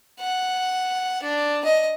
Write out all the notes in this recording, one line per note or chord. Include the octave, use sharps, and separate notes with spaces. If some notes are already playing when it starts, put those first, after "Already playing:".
F#5
D4
D#5